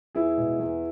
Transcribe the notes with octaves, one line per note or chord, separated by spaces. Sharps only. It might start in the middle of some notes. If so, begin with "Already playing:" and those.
E2 E4 G#4
B2 G#3
E2